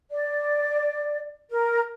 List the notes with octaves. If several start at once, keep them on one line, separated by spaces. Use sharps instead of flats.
D5
A#4